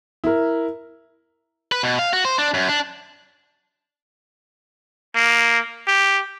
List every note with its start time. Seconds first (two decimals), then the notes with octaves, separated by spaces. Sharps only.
0.24 E4 A#4
1.72 B4
1.83 B2
1.99 F5
2.13 F#4
2.25 C5
2.38 D4
2.54 F#2
2.68 D4
5.15 A#3
5.88 G4